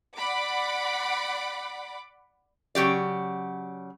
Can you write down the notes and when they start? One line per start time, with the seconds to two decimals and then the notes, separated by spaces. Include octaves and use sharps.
0.17 D5 F#5 B5 D6
2.75 C#3 F#3 G4 D5